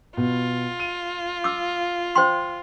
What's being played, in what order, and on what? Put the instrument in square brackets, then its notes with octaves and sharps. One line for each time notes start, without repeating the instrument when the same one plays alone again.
[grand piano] B2 [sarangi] F4
[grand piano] D#7
[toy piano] D6 E6
C5 G5 C6